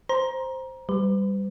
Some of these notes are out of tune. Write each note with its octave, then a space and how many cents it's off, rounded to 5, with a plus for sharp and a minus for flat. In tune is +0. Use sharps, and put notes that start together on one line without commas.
C5 +0 A#5 +20
G3 +0 B4 +40